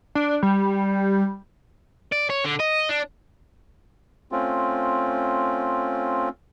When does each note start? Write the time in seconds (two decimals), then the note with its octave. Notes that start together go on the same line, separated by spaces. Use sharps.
0.15 D4
0.43 G3
2.12 D5
2.30 C#5
2.44 D3
2.59 D#5
2.89 D4
4.32 A3 C4 C#4 F4